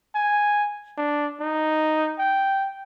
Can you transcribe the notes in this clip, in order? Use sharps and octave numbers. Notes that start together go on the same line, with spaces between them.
G#5
D4
D#4
G5